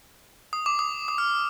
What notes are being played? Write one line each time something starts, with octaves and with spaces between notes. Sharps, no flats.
D#6
D6
D#6
D#6
F6